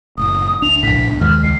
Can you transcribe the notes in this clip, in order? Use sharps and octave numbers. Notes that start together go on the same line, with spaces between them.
F#1 A2 D#6
C#2 D4 F7
A#1 A2 B6
C#2 B2
D#2 D#3 F3 G#3 F6
C#2 C7